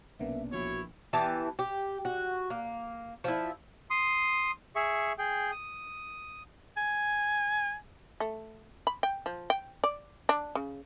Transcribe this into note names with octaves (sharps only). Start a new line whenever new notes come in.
B1 F#2 C3 A#3 B3 D4 E5
A#1 E4 F#4 C#5
E3 B3 G4 A5
G4
F#4
A#3
F3 E4
C6 D#6
G#4 E5 C#6
G#4 G5
D#6
G#5
A3
B5
G5
F3
G5
D5
D4
C#3